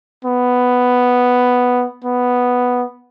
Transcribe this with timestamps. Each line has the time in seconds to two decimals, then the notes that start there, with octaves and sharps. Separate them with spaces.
0.25 B3
2.04 B3